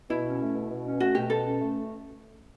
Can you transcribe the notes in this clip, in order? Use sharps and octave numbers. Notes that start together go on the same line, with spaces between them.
B2 E4
C#4
A3
B2
B2
C#4
A3 F#4
B2 G4
B2 A4
C#4
A3